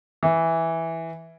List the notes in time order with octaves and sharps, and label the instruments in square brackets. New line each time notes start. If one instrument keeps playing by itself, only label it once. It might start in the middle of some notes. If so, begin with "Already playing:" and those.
[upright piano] E3